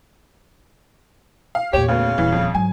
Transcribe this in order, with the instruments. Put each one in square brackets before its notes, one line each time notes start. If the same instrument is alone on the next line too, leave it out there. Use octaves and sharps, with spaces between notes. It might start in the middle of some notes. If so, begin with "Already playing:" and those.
[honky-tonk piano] F5
[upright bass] E2 A#2 [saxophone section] G4 [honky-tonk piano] C#5
[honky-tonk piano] D2 B3 [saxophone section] C#3 F5
[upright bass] D#1 [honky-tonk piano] E3
[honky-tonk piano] F2
[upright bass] G#2 F#3 [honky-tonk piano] G#5